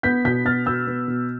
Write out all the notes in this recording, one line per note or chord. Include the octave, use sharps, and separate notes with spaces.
B3 G6 B6
B2 G6 B6
B3 F6 A6
B2 E6 G6
B3
B2